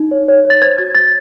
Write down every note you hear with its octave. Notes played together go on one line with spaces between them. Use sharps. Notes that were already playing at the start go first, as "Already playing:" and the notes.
Already playing: D#4
C#5
C#5
C#5
A6
C5 G#6
F#4 G#6
C5 A6